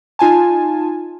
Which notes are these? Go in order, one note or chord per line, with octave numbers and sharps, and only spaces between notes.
D#4 F4 G#5 A5